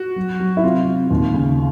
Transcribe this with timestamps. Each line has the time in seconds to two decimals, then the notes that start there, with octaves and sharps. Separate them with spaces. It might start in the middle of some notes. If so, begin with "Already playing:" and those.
Already playing: F#4
0.16 F#3
0.40 F#3
0.57 E4
0.63 C3 F4
0.88 C3
1.11 D#2
1.34 C#3